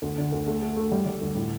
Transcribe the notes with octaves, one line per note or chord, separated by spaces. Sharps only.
D2
D3
D2
A3
A3
A3
G3
G3
D2
A2